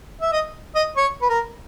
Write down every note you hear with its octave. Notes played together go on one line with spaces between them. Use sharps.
E5
D#5
D#5
C#5
B4
A#4